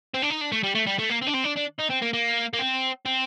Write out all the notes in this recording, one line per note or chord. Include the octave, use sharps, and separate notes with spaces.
C4
D4
D#4
D4
A3
G3
A3
G3
A3
A#3
C4
D4
C4
D4
D4
D#4
C4
A#3
A#3
A#3
C4
C4